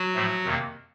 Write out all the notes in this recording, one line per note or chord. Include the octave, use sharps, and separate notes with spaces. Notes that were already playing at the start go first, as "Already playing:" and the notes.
Already playing: F#3 F#4
A2 F3 A3
F2 C3 D#3 A#3